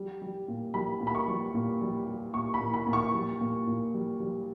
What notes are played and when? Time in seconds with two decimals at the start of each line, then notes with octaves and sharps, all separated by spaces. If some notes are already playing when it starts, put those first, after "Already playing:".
Already playing: G3
0.22 G3
0.48 A#2
0.74 G3 B5
1.01 A#2
1.07 B5
1.15 C#6
1.27 G3
1.55 A#2
1.81 G3
2.07 G3
2.34 A#2 C#6
2.54 B5
2.61 A#2
2.74 B5
2.87 A#2
2.93 C#6
3.13 G3
3.41 A#2
3.67 A#2
3.94 G3
4.20 G3